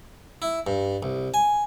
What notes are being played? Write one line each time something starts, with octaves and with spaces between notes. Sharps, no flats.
E4
G2
C2
G#5